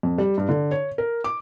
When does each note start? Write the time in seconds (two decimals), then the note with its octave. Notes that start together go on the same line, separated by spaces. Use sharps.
0.03 F2
0.18 G3
0.38 G2
0.49 D3
0.71 C#5
0.98 A#4
1.24 D6